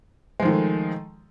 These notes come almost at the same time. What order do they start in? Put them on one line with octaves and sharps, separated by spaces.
G#3 F3 D#3 A3